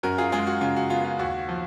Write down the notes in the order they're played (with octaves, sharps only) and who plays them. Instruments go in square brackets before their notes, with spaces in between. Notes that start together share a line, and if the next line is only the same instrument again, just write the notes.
[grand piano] F#2 F#4 A#4
F4 G#4
G#3 F4 G#4
F#4
C#3 F4
F#4
B3 F4
F4
D#2 F#4
F3